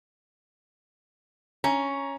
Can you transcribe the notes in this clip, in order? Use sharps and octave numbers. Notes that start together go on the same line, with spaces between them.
C#4 A#5